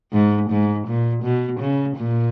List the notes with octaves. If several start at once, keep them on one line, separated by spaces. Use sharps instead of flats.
G#2
G#2
A#2
B2
C#3
A#2